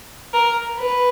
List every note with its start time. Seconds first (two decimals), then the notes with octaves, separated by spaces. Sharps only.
0.34 A#4
0.80 B4